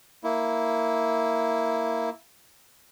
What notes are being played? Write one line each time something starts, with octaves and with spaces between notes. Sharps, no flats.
A#3 E4